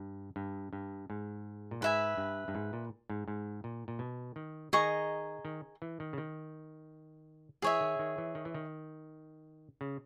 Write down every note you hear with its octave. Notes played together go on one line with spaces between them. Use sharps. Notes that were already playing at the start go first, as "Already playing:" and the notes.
Already playing: G2
G2
G2
G#2
A#2
G#2 B4 E5 G#5
G2
G2
G#2
A#2
G#2
G#2
A#2
A#2
B2
D#3
D#3 G#4 D#5 A#5 C#6
D#3
E3
D#3
C#3
D#3
E3 G#4 C#5 E5
D#3
D#3
E3
D#3
E3
D#3
C#3